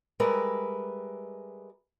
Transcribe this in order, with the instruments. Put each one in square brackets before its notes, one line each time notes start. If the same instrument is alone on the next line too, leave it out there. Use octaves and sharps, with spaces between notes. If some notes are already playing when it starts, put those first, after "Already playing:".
[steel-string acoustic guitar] G3 G#3 A#4 B4 E5